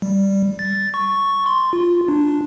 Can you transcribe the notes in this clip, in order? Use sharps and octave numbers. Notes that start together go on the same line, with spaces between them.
G3
A6
C#6
C6
F4
D4